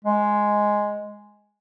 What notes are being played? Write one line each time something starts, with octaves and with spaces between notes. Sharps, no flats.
G#3